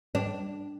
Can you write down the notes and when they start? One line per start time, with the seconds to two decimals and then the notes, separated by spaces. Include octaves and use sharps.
0.15 D4